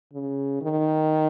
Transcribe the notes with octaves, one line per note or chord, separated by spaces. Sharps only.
C#3
D#3